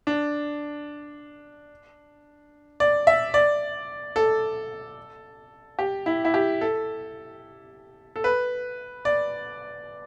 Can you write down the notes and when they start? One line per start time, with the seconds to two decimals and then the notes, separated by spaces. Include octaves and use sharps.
0.07 D4
2.80 D5
3.07 E5
3.34 D5
4.16 A4
5.79 G4
6.06 E4
6.25 E4
6.34 G4
6.61 A4
8.16 A4
8.24 B4
9.05 D5